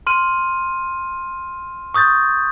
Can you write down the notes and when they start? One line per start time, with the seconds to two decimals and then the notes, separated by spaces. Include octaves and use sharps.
0.07 C6 F6 D#7
1.94 C#6 D#6 G6 A6